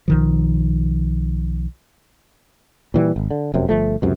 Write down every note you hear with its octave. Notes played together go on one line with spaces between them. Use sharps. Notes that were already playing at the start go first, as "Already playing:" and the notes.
B1 D#3 F3
A#2 E3 G3
G#1
D3
F1 F#2 C3
G1 F3 A3
C#2 F#2 C3